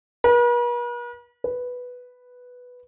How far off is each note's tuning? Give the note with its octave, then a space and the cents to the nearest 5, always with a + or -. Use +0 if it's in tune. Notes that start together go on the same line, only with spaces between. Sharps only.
B4 -45
B4 +0